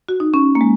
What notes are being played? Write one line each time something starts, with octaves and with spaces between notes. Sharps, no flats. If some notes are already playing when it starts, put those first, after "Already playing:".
F#4
D#4
C#4
A#3
G#3